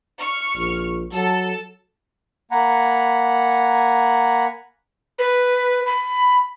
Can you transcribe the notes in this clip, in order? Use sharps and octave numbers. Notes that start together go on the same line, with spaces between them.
C#6 F6
A#1
F#3 A4
A#3 F#5 G#5 A#5 B5
B4
B5